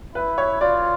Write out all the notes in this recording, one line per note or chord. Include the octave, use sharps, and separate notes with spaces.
E4 B4
C#5
F4 D5